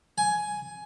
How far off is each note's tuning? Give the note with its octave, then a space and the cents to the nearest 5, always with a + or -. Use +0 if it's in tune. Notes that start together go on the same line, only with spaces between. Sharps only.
G#5 +10